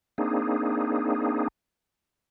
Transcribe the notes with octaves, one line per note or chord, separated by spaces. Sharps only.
A#3 C4 D4 D#4 G#4